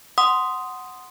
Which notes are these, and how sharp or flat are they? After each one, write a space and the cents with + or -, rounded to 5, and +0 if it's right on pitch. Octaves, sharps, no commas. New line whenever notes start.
F#5 +0 C6 -5 D#6 +0